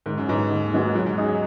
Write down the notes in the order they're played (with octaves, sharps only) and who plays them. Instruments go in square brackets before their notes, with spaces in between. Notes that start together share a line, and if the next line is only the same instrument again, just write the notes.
[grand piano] G#2 [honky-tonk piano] D#3
[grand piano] F#2
[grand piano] G#2 [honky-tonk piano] F#3 B3 D#4 F#4
[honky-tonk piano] D#2
D#3 G#3 B3 F#4
[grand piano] G#2 [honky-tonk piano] F#3
[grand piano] G#2
[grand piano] F#2 [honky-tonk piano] D#4 G#4
[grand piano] F#3